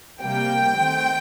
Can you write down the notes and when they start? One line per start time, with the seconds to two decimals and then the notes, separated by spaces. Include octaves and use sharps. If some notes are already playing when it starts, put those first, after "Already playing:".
0.23 C3 G3 A#3 G5
0.77 D#3 A3 C4